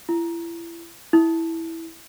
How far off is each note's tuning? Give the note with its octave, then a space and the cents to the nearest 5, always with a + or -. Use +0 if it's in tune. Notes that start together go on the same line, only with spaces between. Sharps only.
E4 +35
E4 -5